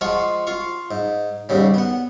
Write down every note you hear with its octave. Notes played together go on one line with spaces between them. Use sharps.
F3 G#3 F4 F5 F#5 C#6
F4 F5 C#6
G#2
D#2 G#2 C#3 G3
B3 F#5